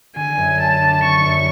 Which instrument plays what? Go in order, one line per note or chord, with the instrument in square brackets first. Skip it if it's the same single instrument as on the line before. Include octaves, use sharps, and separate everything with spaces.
[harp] D3 [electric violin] G#5
[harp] F#2
[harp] A3 [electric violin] A5
[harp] D4
[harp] D3 [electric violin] C#6
[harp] F#2